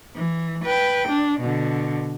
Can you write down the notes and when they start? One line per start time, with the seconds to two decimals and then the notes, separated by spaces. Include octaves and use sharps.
0.16 E3
0.65 B4 G5
1.08 D4
1.41 B2 D3